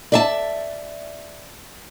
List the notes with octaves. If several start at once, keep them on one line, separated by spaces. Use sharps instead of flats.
D5 E5 A5